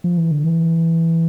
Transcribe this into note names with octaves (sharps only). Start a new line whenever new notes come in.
F3
E3
D3
E3